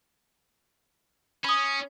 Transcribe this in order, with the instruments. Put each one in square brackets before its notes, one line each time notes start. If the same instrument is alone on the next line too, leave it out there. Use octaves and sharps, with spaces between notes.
[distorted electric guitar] C#4 [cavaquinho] B5 D#6